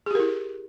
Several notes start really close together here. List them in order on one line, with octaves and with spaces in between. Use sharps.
G#4 G4 A#4 E4